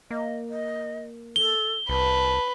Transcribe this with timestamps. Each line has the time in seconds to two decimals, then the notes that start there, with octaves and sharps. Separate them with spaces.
0.11 A#3 D#5
0.50 D#5
1.36 A4 G7
1.89 C2 B4 A5